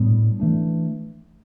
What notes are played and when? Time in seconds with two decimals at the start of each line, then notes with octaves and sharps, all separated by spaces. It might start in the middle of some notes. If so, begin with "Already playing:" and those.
Already playing: A2 G3 B3 D4
0.40 E3 A3 D4